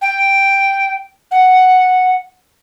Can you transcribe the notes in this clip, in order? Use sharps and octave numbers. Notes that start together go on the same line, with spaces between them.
G5
F#5